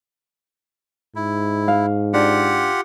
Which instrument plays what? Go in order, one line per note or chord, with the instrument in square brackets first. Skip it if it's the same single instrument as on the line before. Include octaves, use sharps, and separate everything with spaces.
[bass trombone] G#2 [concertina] E4
[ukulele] F5
[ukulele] D4 [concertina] F4 G4 F#5